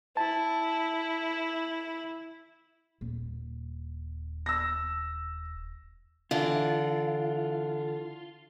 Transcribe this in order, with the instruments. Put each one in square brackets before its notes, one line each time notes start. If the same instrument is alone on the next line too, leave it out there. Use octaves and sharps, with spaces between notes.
[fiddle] E4 [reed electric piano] A5
[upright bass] D#1
[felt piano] E6 A#6
[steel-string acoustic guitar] D3 E3 [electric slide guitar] F4